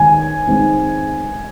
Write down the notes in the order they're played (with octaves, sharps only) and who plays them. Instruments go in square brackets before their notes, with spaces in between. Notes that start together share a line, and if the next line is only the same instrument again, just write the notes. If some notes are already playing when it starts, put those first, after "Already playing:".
Already playing: [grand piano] D#2 D#3 G#3 [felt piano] G#5
[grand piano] D#3 G#3 C4 D#4